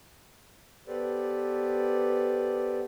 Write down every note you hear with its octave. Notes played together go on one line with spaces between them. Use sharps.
B3 G4 A4 B4 C5 D5